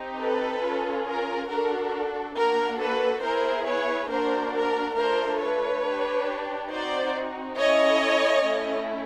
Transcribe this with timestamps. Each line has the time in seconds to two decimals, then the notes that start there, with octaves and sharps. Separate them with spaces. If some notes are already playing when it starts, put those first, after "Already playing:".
Already playing: C4 D#4 G4
0.20 A4 B4
0.62 C#4 F4 G#4
1.06 A#4
1.49 D4 F#4 A4 A#4
2.37 A#3 D4 F#4 A#4
2.80 A4 B4
3.23 B3 E4 G#4 A#4 C5
3.67 B4 C#5
4.11 A#3 D4 F#4 A#4 C5
4.55 A#4
4.97 A3 D4 F4 A4 A#4 C5
5.41 B4 C#5
5.85 D4 G4
6.71 C4 D#4 F#4 C5 D5
7.58 C#4 E4 A4 C#5 D#5
8.45 A3 C#4 E4 A4